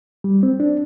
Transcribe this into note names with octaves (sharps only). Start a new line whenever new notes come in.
G3
C4
D4